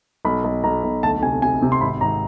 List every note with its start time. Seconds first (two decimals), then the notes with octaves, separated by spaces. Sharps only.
0.25 B1 B5
0.44 B1
0.64 B1 A#5
0.84 B1
1.03 D2 A5
1.23 C3 G#5
1.42 C3 G#5
1.62 C3
1.72 C6
1.81 G#1 B5
2.01 G#1 A#5